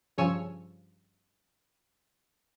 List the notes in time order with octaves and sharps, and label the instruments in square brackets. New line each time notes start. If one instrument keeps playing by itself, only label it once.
[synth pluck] G2 C#3 F3 C#5 G#5 E6